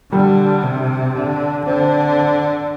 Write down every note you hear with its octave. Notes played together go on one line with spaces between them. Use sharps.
D3 G3
C3
D3
D3 C4